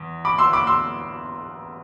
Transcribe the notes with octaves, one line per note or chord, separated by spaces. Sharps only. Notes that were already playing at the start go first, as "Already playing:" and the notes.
Already playing: E2
B5 D6
C6 E6
B5 D6
C6 E6